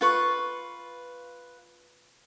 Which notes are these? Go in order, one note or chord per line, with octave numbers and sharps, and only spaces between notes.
F4 B4 C#6